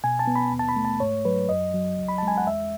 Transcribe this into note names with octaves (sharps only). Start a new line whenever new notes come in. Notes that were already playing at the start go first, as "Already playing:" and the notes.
B2 G#5
A5
B3
B5
D#2
A5
B5
A3
A5
G#2 C#5
F#3 B4
F#2 D#5
F#3
C#2
B5
G#3 A5
G#5
F#5
E2 E5